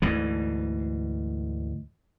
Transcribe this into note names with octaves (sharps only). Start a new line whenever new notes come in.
D2 G#2 E3